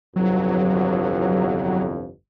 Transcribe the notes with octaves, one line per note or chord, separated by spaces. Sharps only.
G1 C2 F2 F#3